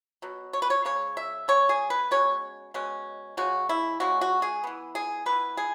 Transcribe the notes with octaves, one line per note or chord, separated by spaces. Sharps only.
B2 F#3
C#5
B4
C#5
C#3 G#3 C#5
E5
C#3 G#3 C#5
G#4
B4
B2 G#3 C#4 C#5
B2 G#3 C#4
C#3 G#3 C#4 F#4
E4
C#3 G#3 C#4 F#4
F#4
G#4
E3 B3
G#4
E3 B3 B4
G#4